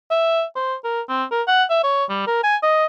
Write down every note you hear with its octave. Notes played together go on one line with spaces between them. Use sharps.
E5
C5
A#4
C4
A#4
F#5
E5
C#5
G3
A#4
G#5
D#5